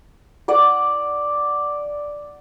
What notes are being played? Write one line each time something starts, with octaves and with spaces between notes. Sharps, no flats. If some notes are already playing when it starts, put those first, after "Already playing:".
D5 F#5 D6